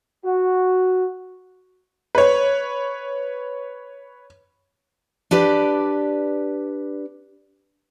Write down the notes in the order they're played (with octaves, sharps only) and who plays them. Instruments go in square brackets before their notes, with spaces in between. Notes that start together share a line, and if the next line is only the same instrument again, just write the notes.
[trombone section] F#4
[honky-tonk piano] B4 C#5
[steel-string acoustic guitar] D4 G4 B4 D5